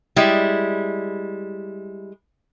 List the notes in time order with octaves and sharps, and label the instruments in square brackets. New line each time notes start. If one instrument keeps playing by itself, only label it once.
[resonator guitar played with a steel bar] G3 G#3 E4